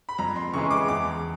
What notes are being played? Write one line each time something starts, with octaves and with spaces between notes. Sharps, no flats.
B5
F2 A#5
C6
C#3 E3 G#3 C#6
D6
E2 D6